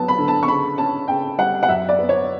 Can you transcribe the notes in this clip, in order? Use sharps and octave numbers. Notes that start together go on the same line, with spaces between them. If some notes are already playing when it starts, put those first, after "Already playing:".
Already playing: F#3 B3 A5
B5
D3
A5
C#6
C#3 B5
C#4 A5
C#3 G5
G3 F#5
F#5
F#2 E5
D5
B3
C#5